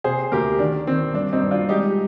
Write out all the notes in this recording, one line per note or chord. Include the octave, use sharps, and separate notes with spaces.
C3 G#4 C5
D2 G4 A#4
D#3 D4
D#3 C4
G2 D4
C4 D#4
G2
D4 F4
G#3 D#4 G4